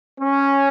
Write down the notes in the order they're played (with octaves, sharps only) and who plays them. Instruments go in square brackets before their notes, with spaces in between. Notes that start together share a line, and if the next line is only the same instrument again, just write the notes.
[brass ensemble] C#4